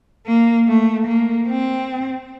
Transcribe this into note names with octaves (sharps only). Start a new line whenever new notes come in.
A#3
A3
A#3
C4